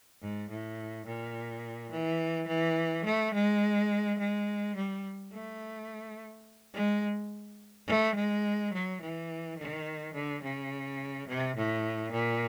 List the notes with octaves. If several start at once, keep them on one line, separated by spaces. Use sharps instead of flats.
G#2
A2
A#2
E3
E3
A3
G#3
G#3
G3
A3
G#3
A3
G#3
F#3
E3
D#3
D3
C#3
C3
A2
A#2